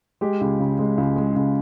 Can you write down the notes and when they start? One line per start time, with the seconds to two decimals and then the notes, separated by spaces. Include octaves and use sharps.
0.21 G#3 G4
0.41 C#2
0.59 C#3
0.79 G#3
0.98 C#2
1.16 G#3
1.36 C#2